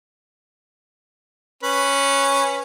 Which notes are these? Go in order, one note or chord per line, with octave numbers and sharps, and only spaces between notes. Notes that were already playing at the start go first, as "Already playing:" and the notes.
C#4 B4